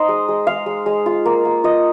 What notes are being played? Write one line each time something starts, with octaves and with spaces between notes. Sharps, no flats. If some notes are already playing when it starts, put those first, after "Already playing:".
Already playing: D#4 C5 D#5
G#3
G#3
G#3 F5
G#3
G#3
F4
A#3
A#3
F4 D#5